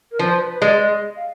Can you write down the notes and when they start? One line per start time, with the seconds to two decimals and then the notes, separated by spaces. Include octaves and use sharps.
0.12 A#4
0.19 F3 B4
0.32 C5
0.41 B4
0.62 G#3 D5
0.76 D5
0.82 D#5
1.16 F5